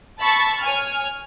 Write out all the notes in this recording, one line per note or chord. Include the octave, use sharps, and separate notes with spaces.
A5 B5 C#6 E6 A6
C#5 G#5 F6